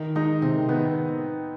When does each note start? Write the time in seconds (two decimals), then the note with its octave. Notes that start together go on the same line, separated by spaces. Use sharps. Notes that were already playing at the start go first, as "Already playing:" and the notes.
Already playing: D#3
0.15 G#3 D#4
0.42 C3 C4
0.69 D#3 B3